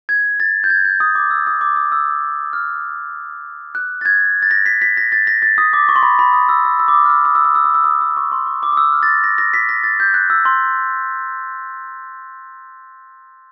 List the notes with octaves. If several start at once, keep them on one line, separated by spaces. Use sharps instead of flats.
G#6
A6
G6
G#6
G6
D#6
D6
E6
D#6
D6
D#6
E6
F6
F#6
A6
G#6
A6
A#6
B6
B6
A#6
A6
A#6
A6
D#6
D6
C#6
C6
B5
B5
D#6
E6
E6
E6
D6
D#6
F6
E6
D#6
E6
D#6
E6
D#6
E6
D#6
D#6
C#6
C6
C#6
D6
D#6
E6
F6
A6
A#6
A#6
A#6
B6
A#6
A6
G6
F#6
E6
C6